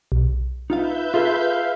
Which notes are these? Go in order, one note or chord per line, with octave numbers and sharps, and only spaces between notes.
B1
D#4 F4 B4 E5 F5 G6
F4 G#4 A4 F5